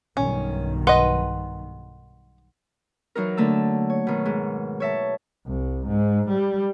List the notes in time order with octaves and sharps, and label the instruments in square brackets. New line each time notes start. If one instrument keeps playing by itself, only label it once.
[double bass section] B1 G2 D#3 [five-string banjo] C#4
[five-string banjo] B4 D#5 [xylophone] F#5 C6
[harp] E3 F#3 D#4 A#4
D3 A3 A#3 A5 E6
C#5
B2 D#3
G#2
C#5 E5 A5
[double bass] C2
G#2
G3